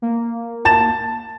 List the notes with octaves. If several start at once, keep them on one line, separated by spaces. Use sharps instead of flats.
A#3
A5 A6 E7